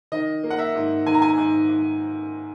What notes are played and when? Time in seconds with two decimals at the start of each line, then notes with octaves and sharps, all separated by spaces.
0.12 D#3 D#5
0.44 A#3
0.51 F#5
0.59 E5
0.75 G#2
1.06 D#3 G#5
1.14 A#5
1.22 G#5
1.37 G#2
1.69 G#2